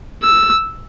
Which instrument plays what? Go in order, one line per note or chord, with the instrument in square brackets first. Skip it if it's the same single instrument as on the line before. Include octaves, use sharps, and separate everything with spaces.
[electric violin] E6